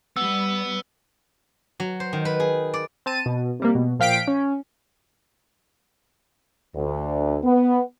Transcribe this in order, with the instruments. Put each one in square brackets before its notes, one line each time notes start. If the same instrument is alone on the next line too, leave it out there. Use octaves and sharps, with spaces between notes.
[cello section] G3 [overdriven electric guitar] B3 [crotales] E6
[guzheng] F#3
C5
D#3
B4
G#4
D5
[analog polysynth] C4 A5 D#7
B2
C3 G3 A#3
B2
A#2 F3 F5 G5 B6 D7
C#4
[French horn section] D2
B3